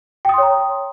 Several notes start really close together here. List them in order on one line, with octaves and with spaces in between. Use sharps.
G5 D#6 C6 C#5 A#5